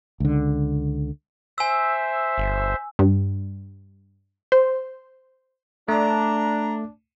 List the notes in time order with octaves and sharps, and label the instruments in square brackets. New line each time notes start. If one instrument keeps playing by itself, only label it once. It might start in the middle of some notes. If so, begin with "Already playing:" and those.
[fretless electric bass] C#2 D3
[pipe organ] C5 E5 [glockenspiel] G#5 E6
[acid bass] G1
[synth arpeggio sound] G2
C5
[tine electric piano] A3 [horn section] D4 [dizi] A#5